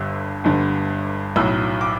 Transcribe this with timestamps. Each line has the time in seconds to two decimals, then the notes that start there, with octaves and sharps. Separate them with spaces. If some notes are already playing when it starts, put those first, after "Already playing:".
Already playing: G1 G2 D3 E6
0.44 G1 G2 D3
1.36 B1 A2 F#3 E6
1.81 D6